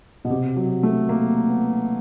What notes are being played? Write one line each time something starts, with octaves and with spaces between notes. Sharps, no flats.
B2
C3
F#3
A3
A#3
B3